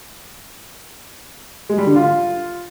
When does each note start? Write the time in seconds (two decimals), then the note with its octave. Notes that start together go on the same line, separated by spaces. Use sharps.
1.69 G#3
1.78 G3
1.87 D3
1.96 F4